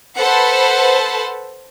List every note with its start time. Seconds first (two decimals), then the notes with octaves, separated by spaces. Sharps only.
0.19 A4 B4 C5 F#5 A5 B5